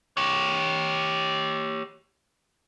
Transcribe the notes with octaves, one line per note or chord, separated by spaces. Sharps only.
G4 C#5